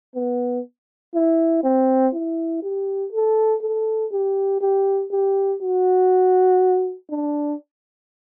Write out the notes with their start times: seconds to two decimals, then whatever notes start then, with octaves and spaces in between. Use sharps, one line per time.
0.15 B3
1.14 E4
1.63 C4
2.13 E4
2.62 G4
3.12 A4
3.62 A4
4.12 G4
4.61 G4
5.11 G4
5.61 F#4
7.10 D4